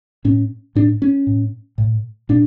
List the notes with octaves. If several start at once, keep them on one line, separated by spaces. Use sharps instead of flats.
A2 C#4
A2 D4
C#4
A2
A2
A#2 D4